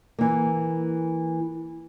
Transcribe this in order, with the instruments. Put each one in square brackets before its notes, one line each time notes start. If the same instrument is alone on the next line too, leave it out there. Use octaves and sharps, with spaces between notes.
[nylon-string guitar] E3 A#3